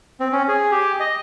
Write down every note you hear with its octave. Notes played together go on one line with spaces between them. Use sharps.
C4
C#4
G#4
G4
D#5